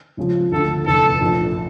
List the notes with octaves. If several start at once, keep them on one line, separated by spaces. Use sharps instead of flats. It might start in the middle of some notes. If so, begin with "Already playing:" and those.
C#2 C#3 F3
D2 D3 F3 A3 A4
F1 E2 C#3 A4
A#1 A#2 A3 D4